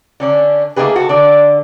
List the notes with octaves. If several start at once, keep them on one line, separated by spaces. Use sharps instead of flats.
D3 C#4 D4
A3 A#3 D#4 G4 G#4 B4
F#4 A4
D3 D5